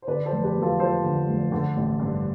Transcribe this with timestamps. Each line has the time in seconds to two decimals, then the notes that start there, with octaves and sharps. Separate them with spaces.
0.02 C5
0.07 D3 B4 D5
0.26 A4 C5
0.32 F1
0.44 G4 B4
0.56 E2
0.62 F4 A4
0.79 F3 A4 C5
1.04 D3
1.28 F1
1.52 D3
1.76 A1
2.00 G2